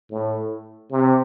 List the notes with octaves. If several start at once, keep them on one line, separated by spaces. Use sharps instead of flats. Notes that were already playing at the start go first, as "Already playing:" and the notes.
A2
C3